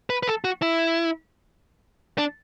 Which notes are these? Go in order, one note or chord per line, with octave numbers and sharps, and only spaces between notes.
B4
B4
A4
F#4
E4
D4